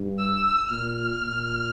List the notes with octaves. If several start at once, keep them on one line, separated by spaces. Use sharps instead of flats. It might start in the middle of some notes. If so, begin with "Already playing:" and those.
Already playing: G2
E6
A#2 F6
A#2